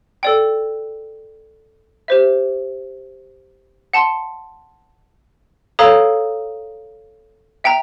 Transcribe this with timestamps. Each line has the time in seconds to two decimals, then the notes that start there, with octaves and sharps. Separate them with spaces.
0.23 A4 D5 G5
2.08 G4 C5 E5
3.94 F#5 A5 C6
5.79 A4 C#5 F5 A#5 D#6
7.64 E5 G5 A#5